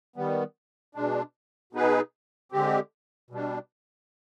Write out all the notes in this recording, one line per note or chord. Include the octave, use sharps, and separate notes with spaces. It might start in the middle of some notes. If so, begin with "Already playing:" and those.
D#3 G3 B3
B2 G#3 D4
B2 B3 D#4 G#4 B4
D3 G#3 C4 G4
B2 G3 D4